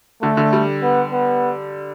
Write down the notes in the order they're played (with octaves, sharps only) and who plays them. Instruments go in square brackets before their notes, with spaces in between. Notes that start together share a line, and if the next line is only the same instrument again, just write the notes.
[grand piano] D3 [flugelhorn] A3
[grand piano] D3
G3
[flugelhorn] B3
B3